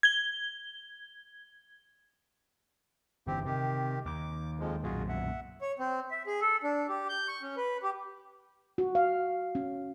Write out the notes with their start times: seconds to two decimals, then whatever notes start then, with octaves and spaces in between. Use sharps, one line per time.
0.03 G#6 G7
3.27 G1 D3 E3 C4 G4
3.46 C3 D#3 G4
4.06 D#2 D6
4.60 F2 F3 G#3
4.84 B1 F#2 A#2 F4 F#4 G#4
5.09 E5 F#5
5.61 C#5
5.79 C4
6.11 E5
6.27 G#4
6.41 A4
6.63 D4
6.88 G4
7.09 G6
7.28 C#6
7.43 C#4
7.57 B4
7.83 G4
8.78 F#4
8.95 F5
9.55 C#4